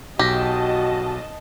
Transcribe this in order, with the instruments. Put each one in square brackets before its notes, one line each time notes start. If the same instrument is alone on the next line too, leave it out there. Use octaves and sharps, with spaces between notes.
[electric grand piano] B1 A#6 [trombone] F#4 [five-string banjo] G4 [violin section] D#5 A5